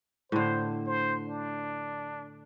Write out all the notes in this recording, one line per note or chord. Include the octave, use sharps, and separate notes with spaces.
A2 D3 C5
C5
D4